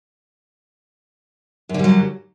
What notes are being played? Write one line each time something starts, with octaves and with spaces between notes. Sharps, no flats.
F#2 D3 F#3 G3